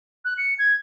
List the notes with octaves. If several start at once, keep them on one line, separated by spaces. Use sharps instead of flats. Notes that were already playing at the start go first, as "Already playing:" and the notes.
F#6
C#7
G#6